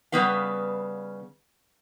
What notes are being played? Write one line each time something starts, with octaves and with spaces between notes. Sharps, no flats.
C#3 G3 B3 B4 F5